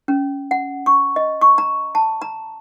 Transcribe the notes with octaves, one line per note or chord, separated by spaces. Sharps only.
C#4
F#5
C#6
D#5
C#6
A#5
A5
A#5